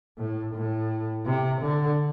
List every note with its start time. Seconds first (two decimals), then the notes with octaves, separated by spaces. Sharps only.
0.18 A2
0.54 A2
1.25 C3
1.62 D3